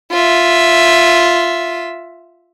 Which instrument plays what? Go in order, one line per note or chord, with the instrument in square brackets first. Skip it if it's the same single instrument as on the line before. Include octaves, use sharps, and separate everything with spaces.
[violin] F4 E5